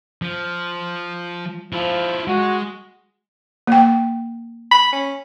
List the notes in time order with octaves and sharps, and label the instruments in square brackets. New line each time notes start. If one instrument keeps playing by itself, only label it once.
[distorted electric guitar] F3
[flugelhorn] F3 [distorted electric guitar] E4 F4
[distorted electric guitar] G#3 [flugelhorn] F#4
[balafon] A#3 G5
[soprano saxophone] B5
C#4